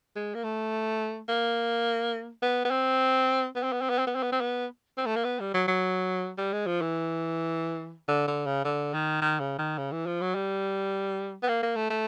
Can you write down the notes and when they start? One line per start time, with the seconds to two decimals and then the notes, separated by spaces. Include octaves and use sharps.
0.16 G#3
0.35 A#3
0.44 A3
1.29 A#3
2.42 B3
2.65 B3
2.71 C4
3.56 B3
3.63 C4
3.73 B3
3.81 C4
3.90 B3
3.99 C4
4.07 B3
4.16 C4
4.23 B3
4.32 C4
4.41 B3
4.98 C4
5.06 A3
5.16 A#3
5.25 B3
5.40 G3
5.54 F#3
5.68 F#3
6.38 G3
6.53 G#3
6.67 F3
6.81 E3
8.08 D3
8.28 D3
8.46 C#3
8.65 D3
8.94 D#3
9.22 D#3
9.40 C#3
9.59 D#3
9.78 C#3
9.92 E3
10.06 F3
10.21 F#3
10.35 G3
11.43 B3
11.49 A#3
11.63 A#3
11.76 A3
11.90 A3